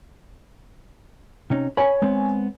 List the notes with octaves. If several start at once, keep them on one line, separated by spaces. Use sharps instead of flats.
C3 C#4 D#4
C#5 G#5 B5
G#3 B3 C4